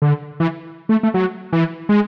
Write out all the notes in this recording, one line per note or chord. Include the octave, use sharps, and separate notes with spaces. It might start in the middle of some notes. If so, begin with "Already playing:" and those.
D3
E3
A3
A3
F#3
E3
G#3